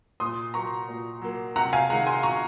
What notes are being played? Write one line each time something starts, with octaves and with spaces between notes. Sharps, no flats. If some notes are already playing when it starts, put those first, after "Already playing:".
A#2 C6 D#6
F#3 A#3 A#5 C#6
A#2
F#3 A#3
C3 F#5 A#5
F5 G#5
D#3 G#3 F#5 A#5
G#5 C6
C3 A#5 C#6